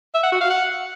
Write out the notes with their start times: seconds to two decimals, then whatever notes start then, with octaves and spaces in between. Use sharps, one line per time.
0.14 E5
0.23 F#5
0.32 F#4
0.41 F5
0.50 F#5